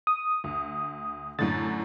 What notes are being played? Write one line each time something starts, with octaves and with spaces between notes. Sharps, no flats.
D#6
D2
F#2 A2 D3 A6